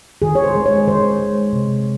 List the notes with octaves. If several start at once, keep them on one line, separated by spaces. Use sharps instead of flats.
D#3 G#4
C#5
C5
G#3
C#5
D#3 C5
G#3
C3